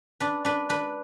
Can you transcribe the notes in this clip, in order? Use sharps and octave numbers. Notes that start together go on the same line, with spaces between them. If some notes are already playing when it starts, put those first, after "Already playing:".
D4 B4
D4 B4
D4 B4